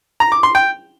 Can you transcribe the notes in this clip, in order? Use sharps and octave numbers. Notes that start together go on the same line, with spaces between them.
A#5
D6
C6
G5